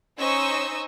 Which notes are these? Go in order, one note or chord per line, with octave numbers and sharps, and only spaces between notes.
C#4 D#4 C5 D#5 C#6 E6